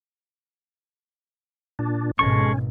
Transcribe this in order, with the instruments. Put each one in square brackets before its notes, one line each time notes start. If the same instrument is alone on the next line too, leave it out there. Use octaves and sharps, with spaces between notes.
[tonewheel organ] A#2 D4
[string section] G#1 [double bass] B2 [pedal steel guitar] G#3 A4 C#6 [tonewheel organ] C#4